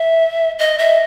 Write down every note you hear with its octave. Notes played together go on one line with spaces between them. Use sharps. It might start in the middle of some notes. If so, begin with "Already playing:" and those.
Already playing: E5
D#5
E5